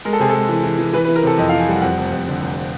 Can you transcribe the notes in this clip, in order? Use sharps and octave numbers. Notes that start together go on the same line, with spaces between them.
G#3 A#4
A4
C3 G#4
G#3 A4
E3
E3
E3
E3 B4
E3 B4
A#4
C3 A4
F2 D#5
E3 F5
G#5
G3 F#5
F2 F#5
F1
F2
D3
F1